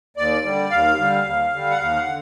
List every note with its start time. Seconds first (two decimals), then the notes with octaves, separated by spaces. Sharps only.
0.17 D#2 D5
0.44 D3 G3
0.71 D#2 F5
0.98 D3 G3
1.25 D#2
1.52 D3 G3
1.70 F#5
1.79 D#2 F5
1.97 F#5
2.06 D3